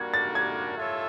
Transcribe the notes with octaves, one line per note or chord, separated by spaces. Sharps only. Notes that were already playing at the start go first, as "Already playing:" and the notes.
Already playing: G3 A#3 D4 F#4 A#4 G#6
A6
G#6
F4 A4 C#5 E5